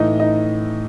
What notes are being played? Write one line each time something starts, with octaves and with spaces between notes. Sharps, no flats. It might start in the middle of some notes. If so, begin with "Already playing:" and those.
Already playing: A2 E3 D#4 D#5
D#4 D#5